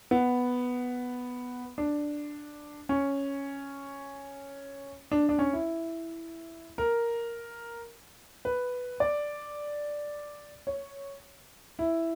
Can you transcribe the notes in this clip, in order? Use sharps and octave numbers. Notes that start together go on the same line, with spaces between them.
B3
D4
C#4
D4
D4
C#4
E4
A#4
B4
D5
C#5
E4